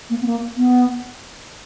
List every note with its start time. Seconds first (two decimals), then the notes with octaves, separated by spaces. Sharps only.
0.10 A#3
0.21 B3
0.26 A#3
0.57 B3